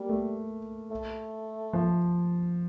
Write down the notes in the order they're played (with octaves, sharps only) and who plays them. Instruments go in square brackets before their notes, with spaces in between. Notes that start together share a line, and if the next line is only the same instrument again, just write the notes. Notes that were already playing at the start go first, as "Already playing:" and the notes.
Already playing: [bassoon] G3 [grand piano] A#3
[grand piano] A3
[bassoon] A3
[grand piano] F3